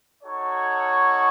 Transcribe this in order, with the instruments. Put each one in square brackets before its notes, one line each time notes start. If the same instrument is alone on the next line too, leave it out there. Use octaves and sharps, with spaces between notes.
[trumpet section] D#4 F#4 A4 C#5